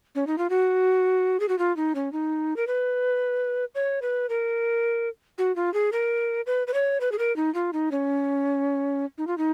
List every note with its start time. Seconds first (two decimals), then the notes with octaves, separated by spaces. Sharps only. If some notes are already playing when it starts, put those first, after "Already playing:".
0.15 C#4
0.27 D#4
0.38 F4
0.50 F#4
1.40 G#4
1.49 F#4
1.59 F4
1.77 D#4
1.95 C#4
2.13 D#4
2.56 A#4
2.67 B4
3.75 C#5
4.02 B4
4.29 A#4
5.38 F#4
5.56 F4
5.74 G#4
5.92 A#4
6.46 B4
6.67 B4
6.74 C#5
7.01 B4
7.12 G#4
7.19 A#4
7.36 D#4
7.54 F4
7.73 D#4
7.91 C#4
9.18 D#4
9.27 F4
9.38 D#4